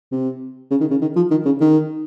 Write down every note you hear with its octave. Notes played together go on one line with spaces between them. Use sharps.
C3
C#3
D#3
C#3
D#3
F3
D#3
C#3
D#3